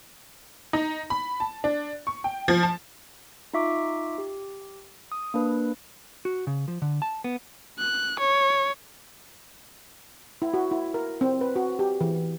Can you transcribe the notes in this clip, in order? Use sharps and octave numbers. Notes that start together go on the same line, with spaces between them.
D#4
B5
A5
D4
C#6
G5
F3
A5
D#4 F4 E5 C#6 D6
G4
D#6
A#3 D4 B4
F#4
C#3
F3
D3
A5
B3
F#6
C#5
E4
F#4
E4
A#4
C4
B4
F#4
G4
E3